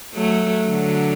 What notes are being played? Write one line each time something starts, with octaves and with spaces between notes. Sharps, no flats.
F#3 A3
D3 F#3